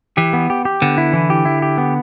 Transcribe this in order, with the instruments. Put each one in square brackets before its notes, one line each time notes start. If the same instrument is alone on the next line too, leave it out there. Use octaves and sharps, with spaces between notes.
[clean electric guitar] E3 [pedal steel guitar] G4
[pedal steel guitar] B3
G4
G4
[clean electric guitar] D3 [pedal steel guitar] B3
[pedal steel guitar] E4
E3
G4
E4
G4
B3